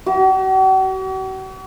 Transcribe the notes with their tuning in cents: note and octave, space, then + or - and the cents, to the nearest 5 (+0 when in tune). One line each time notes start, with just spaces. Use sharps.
F#4 +45